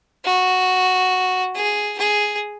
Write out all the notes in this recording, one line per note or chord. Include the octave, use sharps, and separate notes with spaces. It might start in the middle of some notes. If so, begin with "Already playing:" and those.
F#4
G#4
G#4